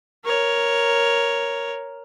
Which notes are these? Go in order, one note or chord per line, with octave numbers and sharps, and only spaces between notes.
A#4 C#5